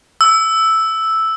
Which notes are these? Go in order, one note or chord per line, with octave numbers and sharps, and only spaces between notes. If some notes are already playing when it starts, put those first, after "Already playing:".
E6